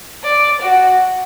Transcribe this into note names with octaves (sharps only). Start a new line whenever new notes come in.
D5
F#4